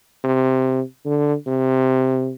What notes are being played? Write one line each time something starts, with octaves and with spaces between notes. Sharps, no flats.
C3
D3
C3